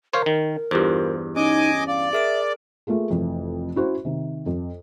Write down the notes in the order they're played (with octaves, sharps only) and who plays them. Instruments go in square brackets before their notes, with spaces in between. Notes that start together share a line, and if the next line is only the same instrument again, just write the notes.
[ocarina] A#4 [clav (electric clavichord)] C5 C#5 F5
[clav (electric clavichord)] D#3
[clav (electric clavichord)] E2 G2 [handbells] F4 G4 C5
[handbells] C#4 [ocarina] D#4 [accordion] D#5 G#5 D6
[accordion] D5 [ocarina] F5
[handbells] G#4 A#4 D7 [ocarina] E5
[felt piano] A3 A#3 F4 G#4
F1 F2 E3
C#4 E4 F#4 C5
C3 D#3
F2